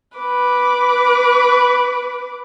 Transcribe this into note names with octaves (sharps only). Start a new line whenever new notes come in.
B4 D6